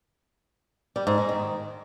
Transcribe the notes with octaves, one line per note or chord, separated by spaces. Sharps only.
G3
G#2
G#3
D#3